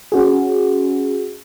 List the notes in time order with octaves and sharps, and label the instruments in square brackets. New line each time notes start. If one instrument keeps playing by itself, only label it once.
[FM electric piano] C#4 F#4 G#4